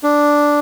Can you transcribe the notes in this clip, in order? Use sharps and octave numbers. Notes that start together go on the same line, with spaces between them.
D4